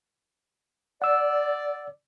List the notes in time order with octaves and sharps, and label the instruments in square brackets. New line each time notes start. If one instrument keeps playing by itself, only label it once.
[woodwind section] D5 [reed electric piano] F#5 E6